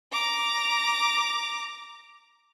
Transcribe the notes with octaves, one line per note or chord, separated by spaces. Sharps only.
A#5 D6